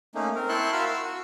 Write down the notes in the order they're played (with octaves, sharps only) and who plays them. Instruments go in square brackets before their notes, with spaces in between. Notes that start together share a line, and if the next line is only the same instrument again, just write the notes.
[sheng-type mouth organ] A3 A#3 C#4 D#4
C4 A#4
E4 G5 A5 C6 C#6 F#6
F#4 A#4 F5 B5 C6 E6
E6
F#4